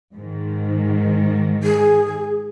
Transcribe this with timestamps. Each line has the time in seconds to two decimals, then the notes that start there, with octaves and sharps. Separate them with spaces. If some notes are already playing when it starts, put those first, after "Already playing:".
0.17 G#2 D#3
1.63 G#4